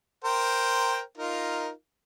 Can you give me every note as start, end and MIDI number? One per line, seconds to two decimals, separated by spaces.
0.25 1.00 70
0.25 1.00 72
0.25 1.00 79
1.18 1.70 63
1.18 1.70 65
1.18 1.70 70